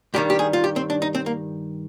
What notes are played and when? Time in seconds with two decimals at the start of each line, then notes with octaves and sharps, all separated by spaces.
0.14 G2 D#3 G3 G4
0.30 G4
0.39 G#4
0.53 F4
0.64 G4
0.76 C4
0.90 D4
1.02 D#4
1.15 C4
1.26 A#3